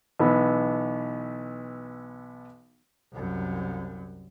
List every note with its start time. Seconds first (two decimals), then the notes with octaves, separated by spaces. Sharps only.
0.19 B1 E3 B3
3.13 C2 F#2